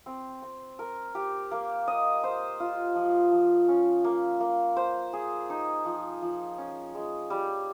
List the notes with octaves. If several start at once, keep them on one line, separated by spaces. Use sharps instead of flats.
C4
C4
A#4
G4
A#3
D#5
C5
F4
F3
F3
C#4
A#3
A#3
C5
G#4
D#4
F3
F3
C#4
G#3
G3